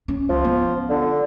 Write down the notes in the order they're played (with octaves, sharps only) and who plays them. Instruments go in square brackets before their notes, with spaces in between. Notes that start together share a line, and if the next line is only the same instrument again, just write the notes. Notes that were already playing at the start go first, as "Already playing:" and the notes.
[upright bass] C#4
[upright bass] C#2 [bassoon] F3
[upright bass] B3
[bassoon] D3